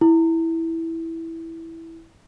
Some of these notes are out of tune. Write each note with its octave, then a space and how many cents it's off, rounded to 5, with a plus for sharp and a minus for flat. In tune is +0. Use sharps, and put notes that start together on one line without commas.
E4 -5